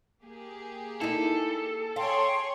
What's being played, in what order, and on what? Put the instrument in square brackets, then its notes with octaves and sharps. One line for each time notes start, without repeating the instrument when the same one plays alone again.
[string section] A#3 G4 G#4
[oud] D#4 E4 [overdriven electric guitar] A4
[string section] G#4 C#5 [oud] F5 [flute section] G5 C6